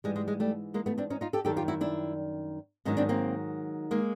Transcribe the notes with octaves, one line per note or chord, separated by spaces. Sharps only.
G#2 E3 G3 G#3
G#3
G#3
G3 A3
G#3 A#3
A3 B3
C4 D4
C#4 D#4
D#4 F4
G4 A4
F#2 D#3 G3 G4 A4
F4 G4
E4 F#4
D4 E4
G#2 D#3 F#3 C#4 D#4
C4 D4
A#3 C4
G#3 A#3